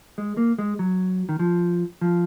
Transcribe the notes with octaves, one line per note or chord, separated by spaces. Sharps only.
G#3
A#3
G#3
F#3
D#3
F3
F3